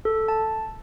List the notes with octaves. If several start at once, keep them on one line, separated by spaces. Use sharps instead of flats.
A4
A5